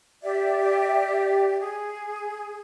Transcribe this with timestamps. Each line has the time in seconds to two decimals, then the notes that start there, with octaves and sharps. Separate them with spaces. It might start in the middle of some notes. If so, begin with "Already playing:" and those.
0.22 G4 D5 E5
1.60 G#4